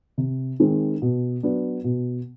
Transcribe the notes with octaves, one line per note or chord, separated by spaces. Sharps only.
C3
D#3 G#3 C4
B2
F#3 B3 D4
B2